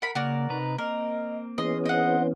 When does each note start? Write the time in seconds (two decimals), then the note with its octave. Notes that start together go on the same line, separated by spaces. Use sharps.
0.02 A#4 F#5 B5
0.15 C#3 A#3 F#4 A#4 D5
0.50 C3 D#4 B4 A#5
0.78 A#3 C4 A#4 D#5
1.58 E3 B3 C#4 G#4 D#5 C6
1.86 C4 C5 D#5 F#5